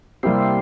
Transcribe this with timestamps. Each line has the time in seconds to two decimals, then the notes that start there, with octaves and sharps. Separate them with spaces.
0.23 C3 G3 A#3 C4 E4 G4